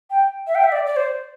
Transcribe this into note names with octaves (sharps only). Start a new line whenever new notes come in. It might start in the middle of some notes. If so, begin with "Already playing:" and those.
G5
E5
G5
E5
D5
D5
C5